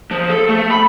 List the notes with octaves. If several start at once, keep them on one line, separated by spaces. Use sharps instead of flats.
F3
A4
A3
B5